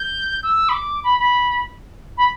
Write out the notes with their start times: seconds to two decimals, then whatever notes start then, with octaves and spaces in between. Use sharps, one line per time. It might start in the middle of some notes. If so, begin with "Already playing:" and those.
Already playing: G6
0.43 E6
0.68 B5
0.72 D6
1.03 B5
1.18 B5
2.17 B5